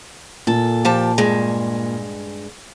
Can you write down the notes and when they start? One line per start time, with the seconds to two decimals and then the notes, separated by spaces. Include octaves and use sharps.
0.47 A#2 A4
0.85 F3 G4 A5
1.18 G2 G#3